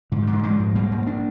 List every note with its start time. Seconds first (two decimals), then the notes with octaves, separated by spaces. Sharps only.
0.12 G#2 D3
0.22 D#3
0.27 G#2
0.32 D3 F3
0.43 G#2 F3 G#3
0.59 G#2
0.75 G#2 G3 A#3
0.91 G#2
1.06 A#3 D4